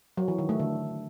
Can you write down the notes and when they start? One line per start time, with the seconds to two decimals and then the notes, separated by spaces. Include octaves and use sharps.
0.17 F#3
0.28 E3
0.38 D#3
0.49 A3
0.60 D3